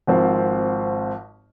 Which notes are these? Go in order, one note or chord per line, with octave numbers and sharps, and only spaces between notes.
G#1 G#2 F3 C4